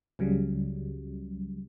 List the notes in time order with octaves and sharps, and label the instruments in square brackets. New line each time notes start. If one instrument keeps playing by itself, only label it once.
[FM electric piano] C#2 C#3 F#3 G3